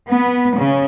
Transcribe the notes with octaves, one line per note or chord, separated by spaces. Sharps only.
B3
C#3